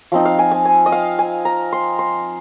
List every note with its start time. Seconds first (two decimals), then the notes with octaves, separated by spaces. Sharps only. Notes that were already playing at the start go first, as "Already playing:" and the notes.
0.12 F3 C4 D#4
0.25 F5
0.39 G#5
0.51 G#5
0.65 G#5
0.86 D#5
0.92 F5
1.19 G#5
1.45 A#5
1.72 C6
1.99 C6